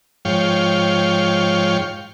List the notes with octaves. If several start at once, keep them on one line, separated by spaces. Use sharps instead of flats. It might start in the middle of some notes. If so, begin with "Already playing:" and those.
G#2 F3 C#5 F5 G5